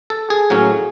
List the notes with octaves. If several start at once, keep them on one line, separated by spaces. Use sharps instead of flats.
A4
G#4
A2 F#3 A#3 C#4